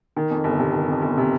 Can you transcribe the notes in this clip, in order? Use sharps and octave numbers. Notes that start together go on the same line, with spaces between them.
D#3
F2
G1
C3
D#3
F2
G1
C3